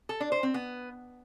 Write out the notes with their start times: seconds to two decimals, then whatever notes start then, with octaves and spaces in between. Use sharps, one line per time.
0.09 A4
0.20 D4
0.32 C5
0.43 C4
0.54 B3